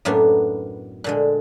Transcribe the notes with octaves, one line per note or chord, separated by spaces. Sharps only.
F#2 A2 A#3 B3 D4
A#2 D3 G#3